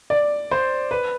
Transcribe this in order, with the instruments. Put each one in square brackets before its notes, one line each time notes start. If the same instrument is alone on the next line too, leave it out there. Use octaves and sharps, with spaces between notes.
[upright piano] D5
C5
B4